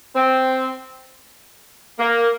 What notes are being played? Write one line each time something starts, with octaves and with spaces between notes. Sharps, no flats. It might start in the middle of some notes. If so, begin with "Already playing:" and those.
C4
A#3